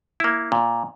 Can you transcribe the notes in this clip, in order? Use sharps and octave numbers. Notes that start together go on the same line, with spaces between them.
A#3 E4
A#2